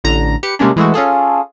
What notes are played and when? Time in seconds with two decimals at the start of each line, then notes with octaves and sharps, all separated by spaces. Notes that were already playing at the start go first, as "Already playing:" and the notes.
0.04 A1 D3 A#5
0.43 G4 B4 C#7
0.59 C3 G3 G#3 A#3 C#4 D4
0.76 E3 G#3 A3 F#4
0.94 C#4 F4 G#4 A4